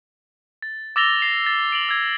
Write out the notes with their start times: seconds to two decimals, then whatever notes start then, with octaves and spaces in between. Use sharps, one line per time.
0.62 A6
0.96 D6 E6 A6 A#6 F7 G7
1.20 A#6 C7 F7
1.46 A6
1.72 D7 F7 F#7
1.89 E6 G#6